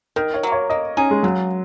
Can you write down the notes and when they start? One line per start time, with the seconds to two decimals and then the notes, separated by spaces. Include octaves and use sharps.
0.16 D#3 A#4
0.34 C#5
0.43 F#3 A#3
0.52 C#5
0.70 A#3 D#5
0.97 C#4 D#4 G#4
1.11 G#3
1.23 C#3 F#3